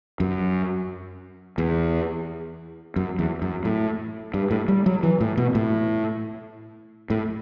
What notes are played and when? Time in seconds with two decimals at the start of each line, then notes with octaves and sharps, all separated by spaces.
0.20 F#2
1.58 E2
2.96 F#2
3.19 E2
3.42 F#2
3.65 A2
4.34 G2
4.51 A2
4.68 G3
4.86 F#3
5.03 E3
5.21 A2
5.37 B2
5.55 A2
7.10 A2